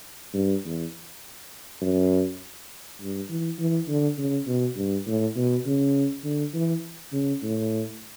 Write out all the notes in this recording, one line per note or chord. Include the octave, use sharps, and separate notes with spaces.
G2
E2
F#2
G2
E3
E3
D3
C#3
B2
G2
A2
B2
C#3
D3
E3
C#3
A2